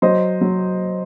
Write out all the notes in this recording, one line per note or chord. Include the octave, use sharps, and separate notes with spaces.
F#3 C5 D#5
F#3